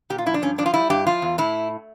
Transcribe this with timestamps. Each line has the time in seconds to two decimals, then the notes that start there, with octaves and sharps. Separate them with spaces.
0.10 A#2 G4
0.18 F4
0.26 F3 E4
0.34 D4
0.42 G2 C#4
0.58 F3 D4
0.66 F4
0.74 G3 E4
0.90 G2 G4
1.07 F3 F4
1.22 E2
1.38 A2 E4